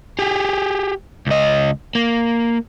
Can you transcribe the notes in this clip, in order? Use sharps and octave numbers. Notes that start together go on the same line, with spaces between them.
G4 G#4
C#2 D#5
A#3